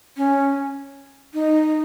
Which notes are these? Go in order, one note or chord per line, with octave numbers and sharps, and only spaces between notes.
C#4
D#4